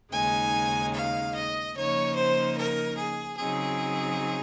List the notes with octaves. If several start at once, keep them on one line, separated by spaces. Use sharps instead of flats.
D#2 C#3 G#3 D#4 G#5
F5
D#5
C#3 F3 A#3 D#4 C#5
C5
A#4
G#4
C#3 F#3 C4 D#4 G#4